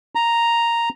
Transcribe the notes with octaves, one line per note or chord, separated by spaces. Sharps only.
A#5